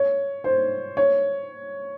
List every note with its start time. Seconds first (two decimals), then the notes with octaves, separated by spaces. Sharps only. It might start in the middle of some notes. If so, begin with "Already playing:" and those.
Already playing: C#5
0.44 C5
0.97 C#5